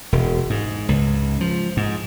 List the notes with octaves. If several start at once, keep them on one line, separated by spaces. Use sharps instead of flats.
E1
G#2
C#2
F3
G#2